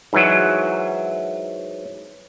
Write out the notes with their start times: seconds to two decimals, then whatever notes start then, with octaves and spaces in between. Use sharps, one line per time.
0.13 G#2 E3 F#3